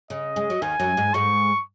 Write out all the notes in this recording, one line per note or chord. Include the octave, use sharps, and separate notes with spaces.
C#3 D#5
G#3
F#3
D#2 D#3 G#5
F#2 F#3
G#2 G#3
G#2 G#3 C#6